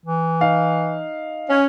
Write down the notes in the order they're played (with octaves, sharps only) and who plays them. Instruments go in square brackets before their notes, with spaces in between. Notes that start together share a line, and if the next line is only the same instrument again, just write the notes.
[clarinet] E3
[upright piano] D#4 F5
[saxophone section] C#4